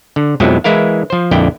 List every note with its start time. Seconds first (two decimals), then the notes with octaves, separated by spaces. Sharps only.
0.16 D3
0.40 F2 B2 F3 F#3 G#3 E4
0.64 E3 G#3 E4 A#4 F5
1.10 F3 C5
1.31 A#1 F2 D3 E4 G5